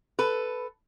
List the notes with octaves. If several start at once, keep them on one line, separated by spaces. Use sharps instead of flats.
A4 B4